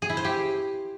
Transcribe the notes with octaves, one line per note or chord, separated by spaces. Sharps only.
G#4
E4
C5
G4